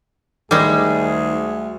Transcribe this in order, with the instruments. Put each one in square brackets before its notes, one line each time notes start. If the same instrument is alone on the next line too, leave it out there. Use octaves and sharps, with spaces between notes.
[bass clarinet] D2 [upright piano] D#3 [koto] G3 G#3 [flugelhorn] G#4